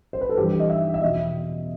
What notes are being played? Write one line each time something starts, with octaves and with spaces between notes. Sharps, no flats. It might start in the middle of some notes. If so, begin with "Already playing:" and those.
C5
B4
A4
G2 E3 G4
D#5
E5
E5
E2 B2 D#5